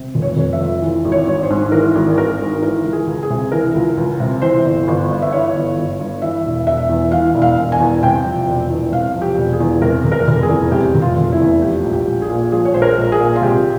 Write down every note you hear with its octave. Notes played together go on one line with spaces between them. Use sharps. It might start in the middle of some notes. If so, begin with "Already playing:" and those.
Already playing: C3
F1
C#5
F1
E5
F2
E3
G#1
C#5
G#1
C5
G#2
E3 A#4
G#1
G#1 A#4
G#2
E3 A#4
C#2
G#4
C#2
G#4
C3
E3 A#4
C#2
C#2
C3
E3 C5
G1
G1
G2
E5
E3 C#5
G1
G1
G2
E3 E5
E1
E1 E5
E2
E3 F5
E1
F5
E1
G#5
E2
C3 G5
F3
E1
E2
C3 F5
F3
G4
E1
G#4
E2
C3 A#4
F1
A#4
F1
G#4
E2
C3 G4
F1
F4
F1
E4
E2
F3 G4
A#1
G4
A#1
G#4
A#2
F3 G#4
C#5
A#1 C5
A#4
A#1
G#4
A#2
F4
C3 G4